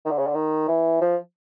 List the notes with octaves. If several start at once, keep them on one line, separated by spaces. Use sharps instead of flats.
D#3
D3
C#3
D3
D#3
E3
F3